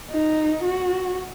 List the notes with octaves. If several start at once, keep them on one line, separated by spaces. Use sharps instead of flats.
D#4
F#4